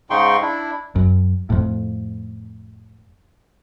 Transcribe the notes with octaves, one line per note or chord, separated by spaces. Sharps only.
G#2 C#3 D#4 G5 C6 C#6
D4 E4
F#2
F2 A2